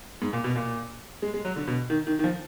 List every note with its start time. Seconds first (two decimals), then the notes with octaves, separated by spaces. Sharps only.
0.22 G#2
0.33 A#2
0.44 B2
0.55 A#2
1.22 G#3
1.34 G#3
1.45 F#3
1.56 D3
1.67 B2
1.90 D#3
2.07 D#3
2.19 D#3
2.24 F3